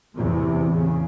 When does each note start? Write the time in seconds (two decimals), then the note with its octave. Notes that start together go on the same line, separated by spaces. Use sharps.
0.16 E2 A2 C3
0.75 C#3